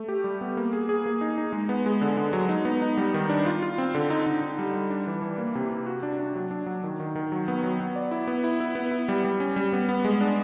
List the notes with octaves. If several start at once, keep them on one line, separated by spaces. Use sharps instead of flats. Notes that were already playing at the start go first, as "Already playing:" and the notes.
Already playing: A3
G4
G3
B3
A#3
G#4
G#4
A#3
D#4
D#4
G#3
B3
G#3
D3
D3
F#3
D#4
B3
D#4
G3
D#3
D4
F4
F4
C4
D3
D#4
D3
D#4
G3
G3
D4
E3
E3
A#3
C3
C3
F#4
D4
D4
F#3
D4
F#3
D#3
D#3
D#3
F#3
B3
F#3
B3
D5
E4
B3
E4
E4
B3
E4
G3
G3
C#4
G3
B3
B3
G#3
D4